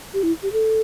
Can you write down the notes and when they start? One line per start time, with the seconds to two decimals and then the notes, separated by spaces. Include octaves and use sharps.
0.14 G4
0.23 E4
0.43 G4
0.53 A4